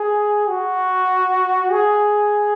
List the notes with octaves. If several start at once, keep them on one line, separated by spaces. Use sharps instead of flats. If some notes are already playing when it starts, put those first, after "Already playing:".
Already playing: G#4
F#4
G#4